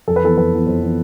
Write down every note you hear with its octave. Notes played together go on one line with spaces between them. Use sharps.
F2 A4
B4
E3 B3 A4
F2 B4
E3 B3
F2 C5
E3 B3